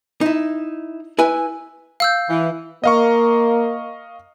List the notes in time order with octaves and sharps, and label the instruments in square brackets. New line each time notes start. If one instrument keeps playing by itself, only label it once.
[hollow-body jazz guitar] D#4 E4
E4 B4 G#5
[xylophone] F5 E6 G6
[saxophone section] E3
[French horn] A#3 [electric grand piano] D#5 F5 C#6